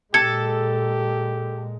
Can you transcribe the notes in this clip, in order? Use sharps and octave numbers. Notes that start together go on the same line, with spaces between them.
A#2 G#3 G4 A4 G#6 C#7